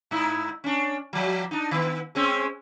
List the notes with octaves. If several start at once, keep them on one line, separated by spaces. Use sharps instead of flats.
G#2 D#4 E4
C#4 D4
F3 F#3
D4 D#4
D#3 B3
G#3 C4 C#4